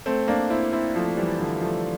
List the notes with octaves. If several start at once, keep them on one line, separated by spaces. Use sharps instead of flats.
A3 C4
A#3 D4
C4 E4
C4 E4
F3 A3
E3 G3
D3 F3
F3 A3